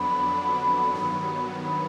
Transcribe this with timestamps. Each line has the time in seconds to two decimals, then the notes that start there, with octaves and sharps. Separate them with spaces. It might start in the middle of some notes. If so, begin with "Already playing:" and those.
Already playing: F2 D3 F#3 B3 D4 B5
0.94 G2 D#3 F#3 B3
1.64 B5